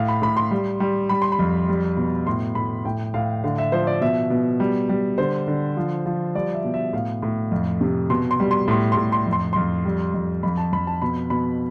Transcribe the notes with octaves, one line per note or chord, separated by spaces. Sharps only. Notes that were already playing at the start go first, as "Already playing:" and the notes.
Already playing: A2 F5
B5
A2 B5
C6
G3
G3
G3 B5
C6
B5
F2
G3
B2
A2 C6
A2 B5
A2 G5
A2 F5
D3 F5
E5
F3 C5
D5
B2 E5
B2
G3
G3
D3 C5
D3
F3
F3
G3 D5
E5
B2
E5
A2 F5
A2
F2
C3
B2 C6
C6
G3
C6
A2 C6
C6
A2
C6
F2
C6
F2 C6
G3
F2
F2 B5
A5
F2 B5
A5
B2 B5
B2 B5